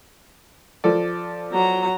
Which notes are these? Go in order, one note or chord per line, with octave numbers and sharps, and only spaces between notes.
F3 A4 D5
F#3 A#5